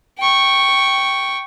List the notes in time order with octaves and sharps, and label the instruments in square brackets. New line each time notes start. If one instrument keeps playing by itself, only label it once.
[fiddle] G5 C#6